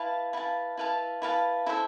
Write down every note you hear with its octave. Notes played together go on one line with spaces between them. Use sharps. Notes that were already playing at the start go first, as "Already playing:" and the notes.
Already playing: E4 B4 F5 A5
E4 B4 F5 A5
E4 B4 F5 A5
E4 B4 F5 A5
E4 A4 C5 E5